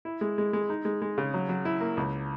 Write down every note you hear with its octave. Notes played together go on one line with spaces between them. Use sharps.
E4
G#3
G#3
G#3
D#4
G#3
G#3
C#3
F#3
F#3
E4
A#3
C#2